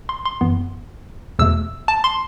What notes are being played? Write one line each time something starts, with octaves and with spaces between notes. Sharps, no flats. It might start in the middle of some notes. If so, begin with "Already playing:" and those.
C6
C6
F#2 E3 B3
E2 B2 A3 E6
A5
C6